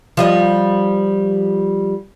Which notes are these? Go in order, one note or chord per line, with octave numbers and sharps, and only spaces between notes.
F3 G3 D#5